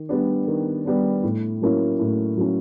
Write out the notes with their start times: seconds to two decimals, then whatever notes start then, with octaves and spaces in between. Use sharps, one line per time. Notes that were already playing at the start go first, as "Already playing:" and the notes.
Already playing: D#3
0.09 G3 B3 D4
0.47 D#3
0.85 G3 B3 D4
1.23 A2
1.61 F#3 A#3 C#4 E4
1.99 A2
2.37 F#3 A#3 C#4 E4